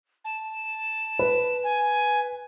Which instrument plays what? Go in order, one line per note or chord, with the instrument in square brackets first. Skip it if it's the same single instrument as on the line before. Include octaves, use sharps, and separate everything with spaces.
[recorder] A5
[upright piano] B4
[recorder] G#5